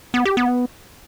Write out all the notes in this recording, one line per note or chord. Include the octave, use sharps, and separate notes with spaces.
B3
G4
B3